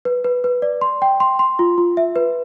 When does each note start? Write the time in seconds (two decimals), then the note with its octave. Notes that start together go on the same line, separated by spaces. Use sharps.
0.05 B4
0.24 B4
0.44 B4
0.62 D5
0.81 C6
1.02 G5
1.20 C6
1.39 C6
1.59 F4
1.78 F4
1.97 E5
2.16 B4